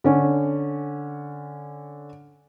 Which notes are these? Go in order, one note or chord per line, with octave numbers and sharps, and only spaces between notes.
D3 C#4